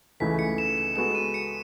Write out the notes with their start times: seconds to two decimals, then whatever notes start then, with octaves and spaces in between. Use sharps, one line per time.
0.20 C#2 C#3 E3 A3 D#4 B6
0.39 C#7
0.58 E7
0.78 E7
0.96 G#3 B3 F#4 A4 E7
1.15 D#7
1.34 C#7